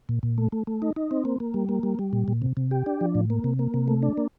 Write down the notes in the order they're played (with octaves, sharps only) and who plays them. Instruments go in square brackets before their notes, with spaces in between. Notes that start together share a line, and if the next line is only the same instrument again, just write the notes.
[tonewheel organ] A#2
A#2
A3
A3
A3
D#4
D#4
C4
A#3
A#3
G3
A#3
G3
G3
A#2
A#2
C3
C3
G4
D4
F3
A2
A#3
C3
A#3
C3
A3
D4
A#3